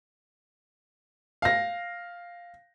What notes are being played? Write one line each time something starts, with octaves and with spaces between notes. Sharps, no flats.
F5 A#6